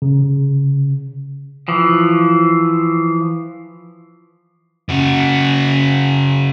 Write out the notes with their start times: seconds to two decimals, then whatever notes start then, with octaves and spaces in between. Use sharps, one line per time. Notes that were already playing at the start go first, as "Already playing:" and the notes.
0.02 C#3
1.68 E3 F3
4.89 C#3 F#4